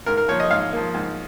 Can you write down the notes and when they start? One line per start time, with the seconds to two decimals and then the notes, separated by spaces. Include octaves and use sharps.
0.06 G#2 A#4
0.17 A#4
0.28 F3 C#5
0.32 A#3
0.40 D#5
0.51 G#2 F5
0.73 F3 A#3
0.94 G#2